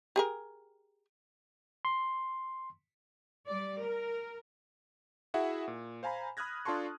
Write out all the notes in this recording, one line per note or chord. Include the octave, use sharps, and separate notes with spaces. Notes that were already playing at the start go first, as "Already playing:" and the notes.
G4 G#4 A#4
C6
G3 D5
A#4
E4 F#4 G#4 E5 F#5
A#2
C5 F5 G#5 A#5 B5
B5 D#6 F6 F#6 G#6 A#6
D4 F4 A4 A5 C6 C#6